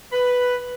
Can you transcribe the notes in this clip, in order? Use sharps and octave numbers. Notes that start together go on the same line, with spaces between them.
B4